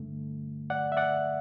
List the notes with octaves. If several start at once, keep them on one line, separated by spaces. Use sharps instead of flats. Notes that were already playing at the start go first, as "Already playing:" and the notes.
Already playing: G2 D3 A3
D5 F#5
E5
D5 F#5